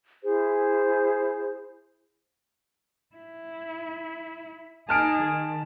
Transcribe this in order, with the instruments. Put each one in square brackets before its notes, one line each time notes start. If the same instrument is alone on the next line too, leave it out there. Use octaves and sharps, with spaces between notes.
[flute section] E4 G#4 C5
[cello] E4
[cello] D#4 G#4 [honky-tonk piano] A5 F6 D7
[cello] D#3